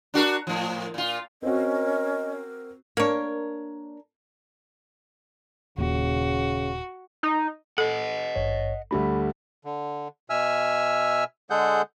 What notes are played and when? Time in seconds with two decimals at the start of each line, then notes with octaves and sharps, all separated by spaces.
0.14 D4 F#4 A#4
0.47 A2 F3
0.94 A#2 F4
1.42 C4 C#4 F#4 A#4 D#5
2.97 A#3 D4 A#4 C#5
5.78 D#1 A#2 C#3 F#4
7.23 D#4
7.78 A4 D#5 F#5
8.36 G#1 G2 C#5
8.91 D2 G3 A3 B5
9.65 D3
10.30 B2 E5 G#5 E6 F6
11.50 D3 G#3 G#4 A4 F#5 G6